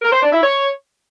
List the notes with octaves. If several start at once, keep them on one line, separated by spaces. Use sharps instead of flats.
A#4
C5
D4
E4
C#5